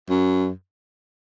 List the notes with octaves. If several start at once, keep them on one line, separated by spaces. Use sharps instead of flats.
F#2